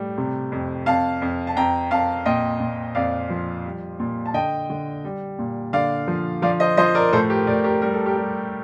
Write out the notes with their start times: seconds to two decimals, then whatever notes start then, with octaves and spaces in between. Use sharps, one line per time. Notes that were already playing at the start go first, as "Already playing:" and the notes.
Already playing: A2 G3
0.18 C3
0.52 F2
0.86 F2 F5 A5
1.22 F2
1.47 A5
1.56 F2 G5 A#5
1.91 F2 F5 A5
2.26 A#2 D#5 G5
2.60 A#2
2.95 F2 D5 F5
3.30 F3
3.65 G3
3.99 A#2
4.26 A5
4.34 D3 D#5 G5
4.70 D3
5.04 G3
5.39 A#2
5.73 D3 D5 F5
6.08 F3
6.42 F3 D5 F5
6.60 C5 D#5
6.77 F3 C5 D#5
6.95 A#4 D5
7.12 A2 A4 C5
7.30 G4 A#4
7.47 A2 A#4 D5
7.64 G4 A#4
7.82 G3 A#4
7.94 A4
8.06 G4 A#4
8.16 G3